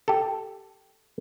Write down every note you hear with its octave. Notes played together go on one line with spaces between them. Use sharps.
G4 A4